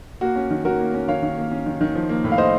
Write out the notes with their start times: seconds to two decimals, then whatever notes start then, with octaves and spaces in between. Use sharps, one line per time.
0.21 A#3 F#4
0.36 C#4
0.50 D#3
0.64 D#3 F#4 A#4
0.79 A#3
0.94 C#4
1.08 D#3 C#5 F5
1.22 D#3
1.38 A#3
1.51 C#4
1.66 D#3
1.81 D#3
1.95 F3
2.09 A#3
2.24 A2
2.32 F5
2.38 A2 C5 D#5